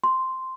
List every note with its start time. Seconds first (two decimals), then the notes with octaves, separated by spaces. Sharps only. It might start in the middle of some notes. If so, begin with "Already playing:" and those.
0.04 C6